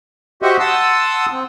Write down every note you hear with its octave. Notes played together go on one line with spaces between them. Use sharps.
F#4 G4 C5 D#5 E5 F#5
F#5 A5 C6 D#6 E6
C4